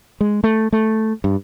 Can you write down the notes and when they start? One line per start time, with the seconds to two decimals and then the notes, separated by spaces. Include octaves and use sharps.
0.21 G#3
0.44 A3
0.73 A3
1.24 G2